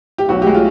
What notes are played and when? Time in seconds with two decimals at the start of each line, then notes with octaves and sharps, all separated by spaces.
0.18 G4
0.29 B1 F#4
0.42 G#3 G4
0.55 F4